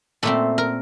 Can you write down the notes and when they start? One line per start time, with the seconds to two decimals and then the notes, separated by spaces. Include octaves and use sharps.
0.23 A#2 A3 C4 A4
0.58 A#4